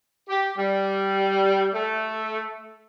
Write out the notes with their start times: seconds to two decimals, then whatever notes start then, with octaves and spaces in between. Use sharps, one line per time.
0.28 G4
0.57 G3
1.74 A3